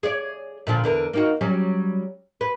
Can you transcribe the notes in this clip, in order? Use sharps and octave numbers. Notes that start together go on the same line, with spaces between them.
G#4 C#5 D5
A#2 D3 F3
E2 D3 A#4
A#3 D#4 F#4
F#3 G3 C#4
B4